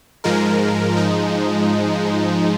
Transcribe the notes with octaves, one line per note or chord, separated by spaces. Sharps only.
G#2 F3 G#3 A#4
D#4